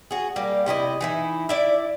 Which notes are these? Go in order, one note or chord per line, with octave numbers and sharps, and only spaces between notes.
F#4 G#4
G3 A#3
C3 E4 F4 D#5
E3 D#4 E4
E4 D5 E5